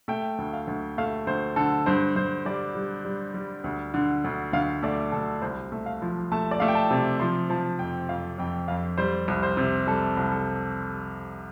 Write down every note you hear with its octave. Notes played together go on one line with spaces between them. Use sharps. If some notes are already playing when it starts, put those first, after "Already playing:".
A3 G5
D2
F5
D2
A3 F5
D2 C5
D3 A4
G2 C5
G2 C5
G3 D5
G3
G3
G3
D2
D3
D2
D2 F5
A3 D5
D2 A4
C2 C5
A3
F5
F3
A3 A5
D5
A3 F5
G5
A5
C3
F3 C6
F3 A5
F2 G5
F2 F5
F2 G5
F2 F5
G3 C5
C2
C5
C3
G3 A4
C2
A4